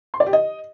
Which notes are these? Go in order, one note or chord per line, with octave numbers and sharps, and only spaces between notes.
C6
D5
G4
D#5